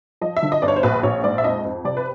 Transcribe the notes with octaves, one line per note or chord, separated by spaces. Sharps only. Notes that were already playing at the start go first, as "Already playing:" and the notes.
F3 D#5
E5
D3
D#5
G1 D5
C#5
C5
A#1 B4
A#1 C#5
G#2 D5
E5
F2 D#5
F2
C3 D5
B4